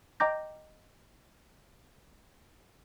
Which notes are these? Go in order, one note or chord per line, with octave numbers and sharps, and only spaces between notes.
D#5 G5 A#5 D6 G6 A#6